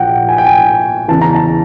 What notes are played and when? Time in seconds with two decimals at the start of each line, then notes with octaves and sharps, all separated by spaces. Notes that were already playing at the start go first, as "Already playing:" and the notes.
Already playing: A#1 A#2 F3 F#5 G5
0.29 G#5
0.38 G5
0.47 G#5
1.08 E2 C#3 E3 A5
1.22 A#5
1.35 A5